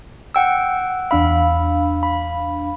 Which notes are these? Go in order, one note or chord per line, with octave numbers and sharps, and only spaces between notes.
F#5 G5 E6
E2 D4 F5 B5 E6
B5